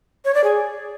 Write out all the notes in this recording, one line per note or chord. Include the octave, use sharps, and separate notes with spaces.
C#5
D5
G#4